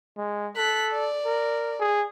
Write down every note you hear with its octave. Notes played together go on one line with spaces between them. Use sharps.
G#3
A4 F#6 B6
D5
A#4
G#4